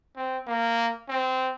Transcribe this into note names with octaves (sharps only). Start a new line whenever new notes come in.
C4
A#3
C4